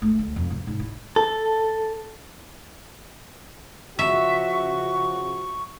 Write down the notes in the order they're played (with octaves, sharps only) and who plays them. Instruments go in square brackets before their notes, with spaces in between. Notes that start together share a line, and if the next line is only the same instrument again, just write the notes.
[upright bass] A3
D2
F2
C#3
G#2
E4
[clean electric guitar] A4
[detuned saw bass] C#3 [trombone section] F3 F#4 [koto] E5 [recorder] C#6